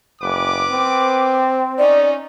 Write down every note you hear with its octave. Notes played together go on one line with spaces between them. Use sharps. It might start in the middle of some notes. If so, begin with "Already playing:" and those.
F#1 B3 B4 D6
C4
C#4 D#4 D5